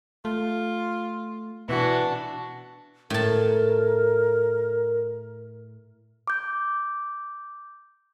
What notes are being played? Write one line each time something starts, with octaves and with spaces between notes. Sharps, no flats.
A3 F4
B2 E3 D4 F#4
A2 A#4 A5
D6 G6